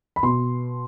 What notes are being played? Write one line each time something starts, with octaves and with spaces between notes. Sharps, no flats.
B5
B2 C6